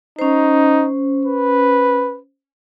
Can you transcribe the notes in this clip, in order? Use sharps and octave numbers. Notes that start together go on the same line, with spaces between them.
C#4 D#4 C5
B4